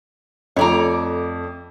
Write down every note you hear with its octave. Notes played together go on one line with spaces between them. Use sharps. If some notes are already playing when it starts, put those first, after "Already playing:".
F2 A3 C#5 D5 A#5